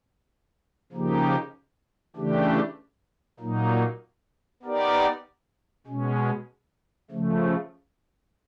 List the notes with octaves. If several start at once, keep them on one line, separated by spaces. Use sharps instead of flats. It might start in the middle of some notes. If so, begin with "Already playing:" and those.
C#3 F3 A#3 D#4 G4
C#3 E3 A3 D4 G4
A#2 F#3 A#3 D#4
B3 D#4 G4 A#4 D5
B2 G#3 C#4
C#3 F3 A3